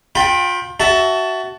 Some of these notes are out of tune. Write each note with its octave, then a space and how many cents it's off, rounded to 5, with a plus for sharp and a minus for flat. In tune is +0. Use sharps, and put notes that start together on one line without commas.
F4 +35 G5 +0 B5 +0
F#4 +20 E5 -5 A5 +0